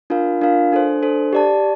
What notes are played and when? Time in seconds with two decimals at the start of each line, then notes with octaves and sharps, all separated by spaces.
0.10 D4 F4 A#4 F5
0.41 D4 F4 A#4 F5
0.72 D4 A4 C5
1.03 D4 A4 C5
1.33 G4 D5 A5